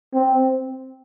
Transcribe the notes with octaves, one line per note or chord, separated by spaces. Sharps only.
C4